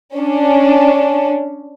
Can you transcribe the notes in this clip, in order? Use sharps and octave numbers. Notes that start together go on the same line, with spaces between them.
C#4 D4